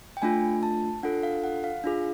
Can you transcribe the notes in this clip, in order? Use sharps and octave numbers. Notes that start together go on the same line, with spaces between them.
G5
A3 D4 F4 G#5
A5
D4 F4 A4 F#5
F5
F#5
F5
D4 F4 G#4